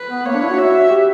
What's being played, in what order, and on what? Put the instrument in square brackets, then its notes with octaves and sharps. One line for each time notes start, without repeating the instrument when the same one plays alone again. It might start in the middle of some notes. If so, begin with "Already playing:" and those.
Already playing: [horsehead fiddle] B4
[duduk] B3
[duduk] A#3 [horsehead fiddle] C#5
[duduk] D4
E4
F#4
[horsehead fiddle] E5
[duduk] G4